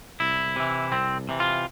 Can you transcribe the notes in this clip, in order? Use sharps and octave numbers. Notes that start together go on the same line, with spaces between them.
C2 E4
C3 E3
C2 C4
C3 E3
F4